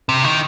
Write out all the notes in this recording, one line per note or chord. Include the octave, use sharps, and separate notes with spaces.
C3
D#3